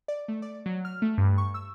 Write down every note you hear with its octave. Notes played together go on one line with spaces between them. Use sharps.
D5
A3
D5
F#3
F6
A3
G2
C#6
E6